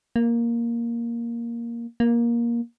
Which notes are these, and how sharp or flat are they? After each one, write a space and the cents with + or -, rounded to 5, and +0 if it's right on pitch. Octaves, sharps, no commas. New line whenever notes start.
A#3 +5
A#3 +15